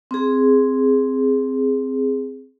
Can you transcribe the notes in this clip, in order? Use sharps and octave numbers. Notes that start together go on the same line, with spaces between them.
C4 G#4